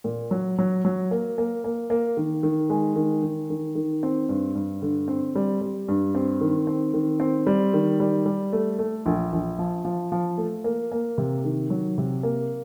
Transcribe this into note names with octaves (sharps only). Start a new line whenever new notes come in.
A#2
F#3
F#3
F#3
A#3
A#3
A#3
A#3
D#3
D#3
G#3
D#3
D#3
D#3
D#3
C4
G2
G2
D3
C4
G3
G3
G2
C4
D#3
C4
D#3
C4
G3
D#3
G3
G3
A3
A3
A#1
A#1
F3
F3
F3
A3
A#3
A#3
C3
D#3
F#3
C3
A#3